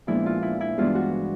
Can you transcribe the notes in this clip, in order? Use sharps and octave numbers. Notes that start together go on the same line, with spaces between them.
A#2 F3 G#3 B3 D4 E4
F4
E4
E4
G2 E3 G#3 B3 D4 F4
F#4